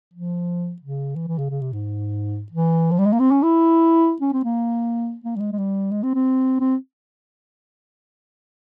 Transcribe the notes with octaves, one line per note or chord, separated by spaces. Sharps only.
F3
C#3
E3
E3
C#3
C#3
C3
G#2
E3
F3
G3
G#3
A#3
C4
C#4
E4
C#4
C4
A#3
A#3
G3
G#3
G#3
G3
G#3
C4
C4
C4